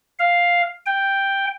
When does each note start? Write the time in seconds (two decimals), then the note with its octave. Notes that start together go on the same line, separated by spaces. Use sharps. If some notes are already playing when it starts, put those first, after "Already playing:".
0.19 F5
0.86 G5